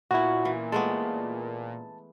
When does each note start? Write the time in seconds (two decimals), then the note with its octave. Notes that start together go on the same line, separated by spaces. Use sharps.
0.11 A#2 B3 C#4 E4 F#4
0.45 E3
0.72 G#3 A3 B3 A5